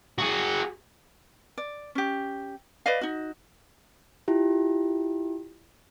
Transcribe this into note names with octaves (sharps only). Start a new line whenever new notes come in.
F#4 G#4
D5
C#4 G4
B4 D5 D#5 F5
D#4 F#4
E4 F4 G4